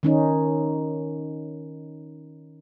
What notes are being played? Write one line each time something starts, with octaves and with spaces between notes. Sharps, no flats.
D#3 C#4 D#4